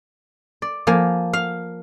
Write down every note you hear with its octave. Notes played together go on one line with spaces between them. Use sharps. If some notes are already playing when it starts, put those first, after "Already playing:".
D5
F3 A#3 G#5
F5